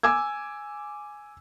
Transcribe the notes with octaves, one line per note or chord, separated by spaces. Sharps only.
G#5 D6 E6 G#6